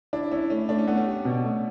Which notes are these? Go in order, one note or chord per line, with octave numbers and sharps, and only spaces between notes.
D4 E4
C#4 E4
A3 C#4
A3 D4
C#4
A3 B3
C#4
G4
B2
A3